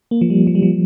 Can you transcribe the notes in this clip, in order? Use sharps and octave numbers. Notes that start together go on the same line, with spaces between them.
A#3
F3
G3
F3
G3
F3